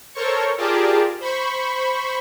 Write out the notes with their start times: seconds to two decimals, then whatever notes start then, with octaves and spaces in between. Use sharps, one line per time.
0.14 A4 A#4 C5 C#5 C#6
0.58 F4 G4 G#4 A#4 D5 A5
1.20 C5 B5 C#6